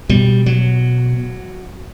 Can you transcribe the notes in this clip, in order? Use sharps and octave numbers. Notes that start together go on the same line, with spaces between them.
B2 G3
F#3